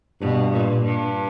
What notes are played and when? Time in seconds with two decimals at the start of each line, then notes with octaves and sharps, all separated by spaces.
0.20 G2 B2
0.52 A#2
0.85 G2